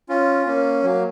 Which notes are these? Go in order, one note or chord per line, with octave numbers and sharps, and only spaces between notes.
C#4 F4
A#3 C#4
F#3 A#3